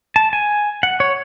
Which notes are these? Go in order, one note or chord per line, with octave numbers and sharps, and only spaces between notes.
A5
G#5
F#5
C#5